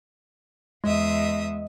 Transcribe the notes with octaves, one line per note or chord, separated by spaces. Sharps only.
E2 G#3 D#5 E5 D#6